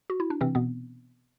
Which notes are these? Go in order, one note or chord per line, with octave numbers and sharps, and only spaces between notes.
F#4
E4
D4
C3 E3 C4
B2 B3